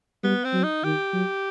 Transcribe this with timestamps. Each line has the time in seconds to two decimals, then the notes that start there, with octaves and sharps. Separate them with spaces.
0.23 G3 B3
0.45 C4
0.53 F#3
0.64 D#4
0.84 D#3 G4
1.13 F#3